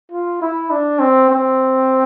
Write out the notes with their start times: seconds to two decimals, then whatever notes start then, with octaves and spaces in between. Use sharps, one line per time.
0.12 F4
0.41 E4
0.71 D4
0.99 C4
1.29 C4